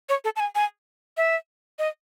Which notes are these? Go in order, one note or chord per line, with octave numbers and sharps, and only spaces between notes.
C#5
A4
A5
G#5
G#5
E5
D#5